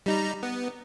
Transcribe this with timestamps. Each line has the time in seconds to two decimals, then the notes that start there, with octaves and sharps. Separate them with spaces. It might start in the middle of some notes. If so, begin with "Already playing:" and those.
0.06 G3 D#4 A#5
0.43 B3